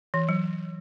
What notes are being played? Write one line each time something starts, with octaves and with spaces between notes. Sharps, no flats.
E3
F#3